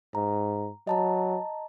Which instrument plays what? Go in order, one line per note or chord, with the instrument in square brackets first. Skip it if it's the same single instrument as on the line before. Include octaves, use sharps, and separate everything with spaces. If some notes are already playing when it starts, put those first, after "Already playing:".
[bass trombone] G#2 [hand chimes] A#5
[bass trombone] F#3 [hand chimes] D#5 A5 A#5